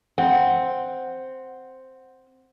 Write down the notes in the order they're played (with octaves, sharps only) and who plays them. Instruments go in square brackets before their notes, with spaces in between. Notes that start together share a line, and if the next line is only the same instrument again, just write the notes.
[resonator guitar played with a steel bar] C4 [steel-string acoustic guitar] F#5